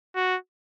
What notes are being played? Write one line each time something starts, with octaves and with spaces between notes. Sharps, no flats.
F#4